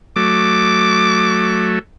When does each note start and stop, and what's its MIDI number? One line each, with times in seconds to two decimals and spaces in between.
0.16 1.79 54
0.16 1.79 57
0.16 1.67 86